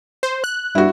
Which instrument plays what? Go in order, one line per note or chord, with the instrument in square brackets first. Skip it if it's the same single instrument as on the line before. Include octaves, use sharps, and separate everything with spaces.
[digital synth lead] C5
F#6
[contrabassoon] G2 [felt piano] E4 F#4